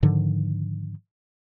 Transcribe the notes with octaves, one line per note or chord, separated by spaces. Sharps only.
G#2 D3 D#3 F3